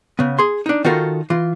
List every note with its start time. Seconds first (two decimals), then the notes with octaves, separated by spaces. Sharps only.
0.19 C#3 B3
0.39 G#4 C6
0.66 D4 D#4
0.84 D#3 D#4 F4 F#4 A4 A#4
1.30 E3 F4